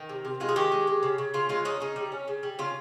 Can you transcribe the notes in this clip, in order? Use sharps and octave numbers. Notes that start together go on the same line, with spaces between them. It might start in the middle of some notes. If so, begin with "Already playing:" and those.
Already playing: D#3
C3
C3
G#3 F4
G#4
D#3 G4
G#3
G#3
C#3
C#3
C#3 F4
G#3 F4
C#4 D#4
C#3 D#4
G3
C#4
C#3
G3
C#3 F4